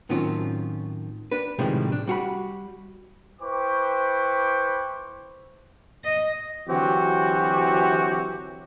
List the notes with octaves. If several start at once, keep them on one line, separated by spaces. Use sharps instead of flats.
A2 D#3 F#3 C4 C#4 F4
D4 B4
A2 C3 D#3 F3 G3 G#3
D4
G3 F#4 F5 B5
E4 B4 C5 G5 C#6 D6
D#5
D3 E3 F#3 C4 F#4 G4